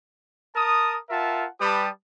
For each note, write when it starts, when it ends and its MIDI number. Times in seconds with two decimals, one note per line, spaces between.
0.56 0.97 70
0.56 0.97 81
0.56 0.97 87
1.10 1.47 65
1.10 1.47 70
1.10 1.47 76
1.10 1.47 78
1.10 1.47 81
1.61 1.89 55
1.61 1.89 67
1.61 1.89 71
1.61 1.89 81
1.61 1.89 87